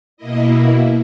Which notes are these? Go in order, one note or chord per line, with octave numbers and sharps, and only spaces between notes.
B2 A#3 E4 D#5